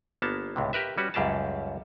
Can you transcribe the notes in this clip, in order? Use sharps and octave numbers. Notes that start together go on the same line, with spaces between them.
G1 A#3 B3 A5
C#2 A2 C3
G4 A#4 B4 E5
G3 C#4 F#4 B4
C#2 F#2 G3 G4 G#4 A5